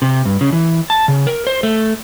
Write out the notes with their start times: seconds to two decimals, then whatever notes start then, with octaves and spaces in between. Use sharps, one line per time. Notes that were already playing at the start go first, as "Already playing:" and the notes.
0.02 C3
0.25 G2
0.41 C#3
0.53 E3
0.90 A5
1.08 C#3
1.27 A#4
1.47 C5
1.63 A3